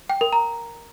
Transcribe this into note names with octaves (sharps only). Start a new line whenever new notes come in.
G5
A#4
A#5